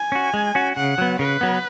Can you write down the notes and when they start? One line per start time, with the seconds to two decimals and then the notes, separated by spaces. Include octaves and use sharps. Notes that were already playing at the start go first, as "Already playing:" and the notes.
Already playing: G#5
0.12 C#4 F#4
0.34 G#3
0.55 C#4 F#4
0.77 C#3 F#5
0.98 F#3 B3
1.19 C#3 B4
1.41 F#3 B3